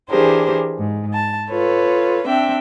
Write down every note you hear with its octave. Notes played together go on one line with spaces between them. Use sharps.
E3 D4 G4 G#4 A#4 C5
G#2
A5
F4 A4 B4 C#5
C4 D4 E5 G5